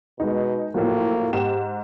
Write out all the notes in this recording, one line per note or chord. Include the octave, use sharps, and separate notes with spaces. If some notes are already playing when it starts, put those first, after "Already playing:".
B2 G#3 D#4
A2 F3 F#3 A#3
G#2 G4 E7